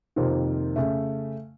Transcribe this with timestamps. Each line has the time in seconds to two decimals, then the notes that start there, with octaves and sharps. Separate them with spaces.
0.16 F2 C3 D#3 A#3 F4
0.76 C#3 A3